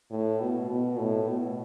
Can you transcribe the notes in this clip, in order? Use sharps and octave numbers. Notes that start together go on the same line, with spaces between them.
A2
B2
B2
A2
B2